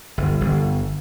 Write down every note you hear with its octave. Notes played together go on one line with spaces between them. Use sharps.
G1
G1